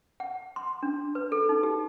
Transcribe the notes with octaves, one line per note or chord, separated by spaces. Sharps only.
F#5
C6
D4
B4
A4
D#4
G4